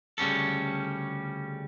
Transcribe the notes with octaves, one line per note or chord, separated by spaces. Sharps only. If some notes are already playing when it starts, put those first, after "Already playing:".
D2 C#3 G3 C#4 A4